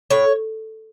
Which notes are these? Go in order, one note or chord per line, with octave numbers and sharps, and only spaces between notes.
A2 C#5